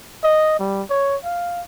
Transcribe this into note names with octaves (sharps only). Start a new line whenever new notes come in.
D#5
G3
C#5
F5